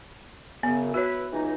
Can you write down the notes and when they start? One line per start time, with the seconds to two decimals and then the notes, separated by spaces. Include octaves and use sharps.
0.63 F#2 C#3 B3
0.94 E4 F#4 B4 C#5
1.32 C#2 E3 D#4